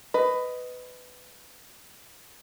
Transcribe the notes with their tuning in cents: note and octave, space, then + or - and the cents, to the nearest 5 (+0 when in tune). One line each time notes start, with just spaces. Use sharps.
B4 +20 D#5 +0